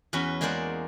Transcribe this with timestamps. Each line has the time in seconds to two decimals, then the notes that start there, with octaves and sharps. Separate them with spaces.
0.13 E2 C#4 F#4 B4
0.41 G#3 A#3 G#4 C5 D5 F#5